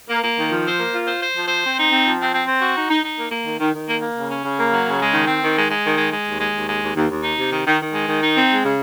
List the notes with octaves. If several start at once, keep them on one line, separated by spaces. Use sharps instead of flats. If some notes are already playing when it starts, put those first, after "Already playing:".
A#3
A#3
D#3
F3
C5
A#3
F4
C5
C5
F3
C5
C4
D#4
C4
F3
C4
C4
C4
F#4
D#4
D#4
D#4
A#3
A#3
D#3
D#3
D#3
A#3
A#3
C#3
C#4
C#3
A#3
F#3
C#3
G#3
D#3
C4
D#3
G#3
G#3
D#3
G#3
G#3
D#2
G#3
D#2
G#3
D#2
D#2
D#2
D#4
C3
D#3
D#3
D#3
G#3
D#3
D#4
C4
G#3
C#3